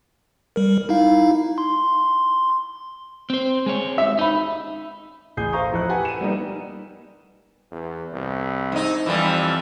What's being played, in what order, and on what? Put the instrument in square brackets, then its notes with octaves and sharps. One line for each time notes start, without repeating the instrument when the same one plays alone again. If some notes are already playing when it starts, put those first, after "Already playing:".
[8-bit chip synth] G3 A#4
D#4 E4 F5
C6
[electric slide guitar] C4 C5
G#3 C4 C#5
[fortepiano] E5
[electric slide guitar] D#4 [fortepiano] E5 B5
[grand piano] A1 G#4 G6 C7
A4 C5 F5 A#5 C#6 D#6
F2 F3 E4 A4 C5 F#6
G4 A4 B4 F#5 G#5
D#7 E7
G3 A#3 B3 D#4
[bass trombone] E2
C2
[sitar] G#2 D#4
[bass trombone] F2 [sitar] E3 G3